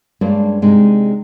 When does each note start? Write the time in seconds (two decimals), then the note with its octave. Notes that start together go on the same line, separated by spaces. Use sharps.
0.21 G2 G#3 A#3 C#4 D4
0.62 C3 G#3 D4 D#4